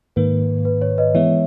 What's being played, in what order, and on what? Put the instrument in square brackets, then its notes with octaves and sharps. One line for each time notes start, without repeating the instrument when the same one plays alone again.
[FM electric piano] G#2 D#3 A#3 [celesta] B4
[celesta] B4
C#5
B4 D#5
[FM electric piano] E3 G#3 B3 [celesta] C#5 E5